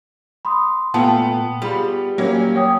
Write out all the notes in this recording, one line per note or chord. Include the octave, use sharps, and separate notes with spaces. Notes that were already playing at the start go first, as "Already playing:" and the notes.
B5 C6 D#6
A#2 A3 B3 F4 G5 A5
G3 F4 G#4 B5
F#3 A#3 C#4
C#5 G5 D#6